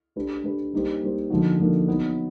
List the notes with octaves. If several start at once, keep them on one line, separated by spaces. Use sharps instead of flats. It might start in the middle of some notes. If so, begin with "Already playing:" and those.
A3 D4 G4 B4
A3 D4 G4 B4
G3 A#3 D#4 G4 C5
G3 A#3 D#4 G4 C5
D3 F3 A#3 D#4 F#4
D3 F3 A#3 D#4 F#4
F#3 B3 D#4